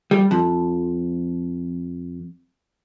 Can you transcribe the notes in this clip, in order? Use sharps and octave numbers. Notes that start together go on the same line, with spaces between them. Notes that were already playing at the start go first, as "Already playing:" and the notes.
G3
F2